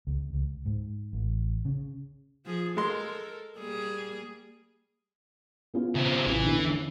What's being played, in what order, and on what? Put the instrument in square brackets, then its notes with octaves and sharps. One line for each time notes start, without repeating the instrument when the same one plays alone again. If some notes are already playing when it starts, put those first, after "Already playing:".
[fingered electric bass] C#2
C#2
G#2
A1
C#3
[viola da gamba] F3 G#4
[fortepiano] G#3 C6 [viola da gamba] A4 A#4
[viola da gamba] G3 A#3 G#4
[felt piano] B3 C#4 F4
[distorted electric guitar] C#3 C4
[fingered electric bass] A1 C3 [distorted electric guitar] E3
[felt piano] E2 C#4 C7 [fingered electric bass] D3